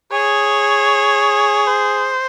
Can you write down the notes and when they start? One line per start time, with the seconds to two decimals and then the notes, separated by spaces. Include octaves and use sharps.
0.12 G#4 C#5
1.67 C5